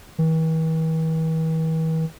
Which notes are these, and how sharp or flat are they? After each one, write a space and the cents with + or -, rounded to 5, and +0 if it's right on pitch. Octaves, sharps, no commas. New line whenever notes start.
E3 -45